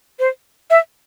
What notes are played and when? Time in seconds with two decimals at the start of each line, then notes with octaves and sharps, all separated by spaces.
0.19 C5
0.70 E5